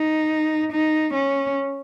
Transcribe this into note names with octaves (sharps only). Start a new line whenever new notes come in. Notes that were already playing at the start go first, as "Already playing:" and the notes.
Already playing: D#4
D#4
C#4